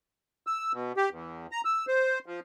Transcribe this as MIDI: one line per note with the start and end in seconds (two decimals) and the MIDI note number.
0.47 0.72 88
0.73 0.92 47
0.97 1.09 67
1.11 1.47 40
1.52 1.61 82
1.65 1.86 88
1.88 2.19 72
2.26 2.40 53